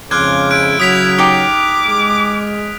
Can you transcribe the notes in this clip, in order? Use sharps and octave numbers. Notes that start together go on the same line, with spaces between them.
F2 G#2 C#3 C6 D6 F6 F#6 G#6
E4 F#6 D7
C#3 F#3 D#6 B6 F7
D#4 G4 D6
G#3